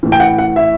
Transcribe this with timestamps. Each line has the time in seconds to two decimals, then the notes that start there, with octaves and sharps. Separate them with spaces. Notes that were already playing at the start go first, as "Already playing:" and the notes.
0.03 A2 E3
0.12 G5
0.20 F#5
0.38 F#5
0.56 E5